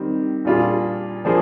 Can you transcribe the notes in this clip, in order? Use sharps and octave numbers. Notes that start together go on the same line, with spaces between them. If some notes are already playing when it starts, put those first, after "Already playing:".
Already playing: D#3 G3 C4
A#2 G3 D4 F4 G#4
F3 A#3 D4 G#4 C5